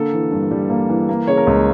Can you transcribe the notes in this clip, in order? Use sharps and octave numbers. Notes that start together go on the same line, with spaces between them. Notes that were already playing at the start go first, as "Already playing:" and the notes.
Already playing: D3 A#3 A4
E3
G2
G3
A#3
E3
A#3
C#3 C#5
A#4
C#2